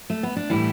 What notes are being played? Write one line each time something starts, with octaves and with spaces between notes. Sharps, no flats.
A3
B3
D4
A2 E3 G3 E4